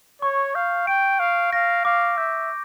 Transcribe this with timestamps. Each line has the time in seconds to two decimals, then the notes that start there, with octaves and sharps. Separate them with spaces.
0.22 C#5 C#6
0.55 F5 G6
0.87 G5 D7
1.19 F5 C#6
1.53 F5 A#6
1.85 F5 D6
2.17 E5 G6